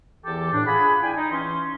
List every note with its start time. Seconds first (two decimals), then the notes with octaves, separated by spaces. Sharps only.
0.25 E2 E3 G4 A4 G5 D6
0.53 A2 D4
0.66 F4 G#4 F#5 G#5 B5
1.02 D4 E4 G5 G#5
1.16 D#4
1.31 E3 C#4 C6